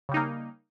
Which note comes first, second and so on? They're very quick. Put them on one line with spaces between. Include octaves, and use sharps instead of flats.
C#3 G3 D#4 A#3